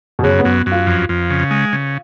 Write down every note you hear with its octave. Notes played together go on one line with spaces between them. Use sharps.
B2
F#2 C#3
B3
F#2
F#2
F4
F2
F2
C#3
G#3
C#3